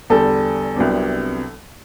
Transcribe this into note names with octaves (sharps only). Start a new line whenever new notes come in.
E2 D3 G3 A4
C2 C3 F#3 B3 D4